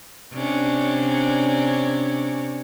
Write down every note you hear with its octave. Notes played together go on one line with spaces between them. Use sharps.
C3 C#4 D4